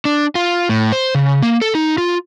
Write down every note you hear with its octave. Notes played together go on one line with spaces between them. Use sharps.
D4
F4
A2
C5
C#3
A#3
A4
D#4
F4